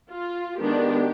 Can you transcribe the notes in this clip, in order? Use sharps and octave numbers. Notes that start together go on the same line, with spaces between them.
F4
D#3 G#3 B3 D4 G4